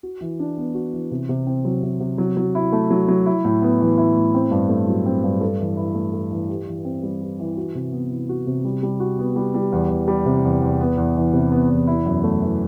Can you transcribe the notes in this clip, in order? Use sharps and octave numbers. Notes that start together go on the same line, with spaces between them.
F#4
E3
D4
B3
F#4
E3
C3
C3
C4
F#3
C3
C3
F#3
F#3
E4
A3
F#3
F#3
E4
A2
B3
E3
E4
A2
C4
G2
A3
F#3
C4
G2
A4
E3
E4
A3
A4
E3
G4
E3
C4
G3
G4
E3
F#4
C3
B3
E3
F#4
C3
G3
G3
F#4
B3
G3
G3
E2
E2
G3
C3
E2
E2
B3
E2
E3
C3
B3
E2
E4
F#2
A3
E3